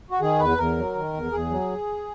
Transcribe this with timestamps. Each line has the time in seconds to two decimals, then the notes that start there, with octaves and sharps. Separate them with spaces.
0.10 F#4
0.21 D#3 G#4
0.39 E2 B4
0.57 E2 A#4
0.77 F#3
0.95 D#3
1.14 E2
1.32 E2 G#4
1.50 F#3